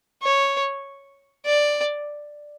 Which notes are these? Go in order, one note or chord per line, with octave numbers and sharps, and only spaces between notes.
C#5
D5